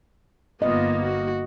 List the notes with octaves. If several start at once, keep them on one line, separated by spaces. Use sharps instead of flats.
G1 A#3 B3 F4 D#5
F#4